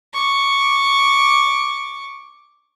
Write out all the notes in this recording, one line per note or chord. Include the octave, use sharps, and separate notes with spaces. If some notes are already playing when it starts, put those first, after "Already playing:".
C#6 D6